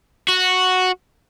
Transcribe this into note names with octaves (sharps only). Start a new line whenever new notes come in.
F#4